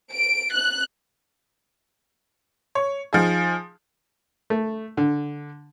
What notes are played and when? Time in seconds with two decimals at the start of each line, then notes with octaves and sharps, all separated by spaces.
0.13 D7
0.53 F#6
2.75 C#5
3.13 F3 D#4 G#4
4.50 A3
4.97 D3